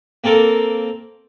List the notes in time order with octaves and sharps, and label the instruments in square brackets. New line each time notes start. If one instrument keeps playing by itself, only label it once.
[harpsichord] A#3 C4 A4 A#4